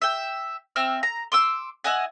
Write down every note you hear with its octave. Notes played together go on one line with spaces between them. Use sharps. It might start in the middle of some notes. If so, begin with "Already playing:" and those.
E5 G5
C4 E5 F6
A#5
C6 D6 E6
E4 D#5 F#5 G#5